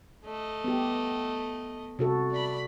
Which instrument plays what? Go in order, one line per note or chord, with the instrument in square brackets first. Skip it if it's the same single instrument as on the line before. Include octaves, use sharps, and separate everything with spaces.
[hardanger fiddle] A3 D#5
[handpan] B3 G4
C3 F#4 A4
[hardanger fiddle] D5 B5